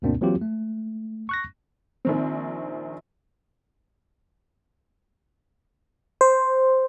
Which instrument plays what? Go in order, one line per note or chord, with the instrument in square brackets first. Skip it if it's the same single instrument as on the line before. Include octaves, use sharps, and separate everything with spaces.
[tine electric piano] D2 G2 B2 A#3 C4 D4
E3 F#3 A#3 C4 F4 G4
A3
C#6 F#6 A#6
[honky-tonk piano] A#1 D#3 C4
[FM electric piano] C5